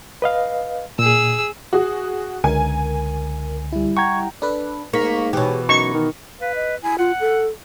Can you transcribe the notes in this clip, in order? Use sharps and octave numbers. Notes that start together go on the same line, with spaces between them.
B4 D#5 F5
A#2 G#4 E6
F#4 G#4
C#2 D3 A#4 G#5
G3 E4
F#5 G5 A#5 C#6 G#6
D4 A4 B4
G#2 A#3 C#6 B6
B2 E3 G4 G#4 C#5
F#2 D#4 A#5 C#6
D#3
B4 F5
D#5
E4 G#5
F4 F#5
A4